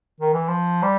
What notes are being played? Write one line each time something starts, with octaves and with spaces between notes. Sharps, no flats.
D#3
E3
F3
G3